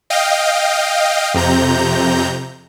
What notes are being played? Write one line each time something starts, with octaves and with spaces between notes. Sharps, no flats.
D#5 F5 G5
F2 C3 A#5 G6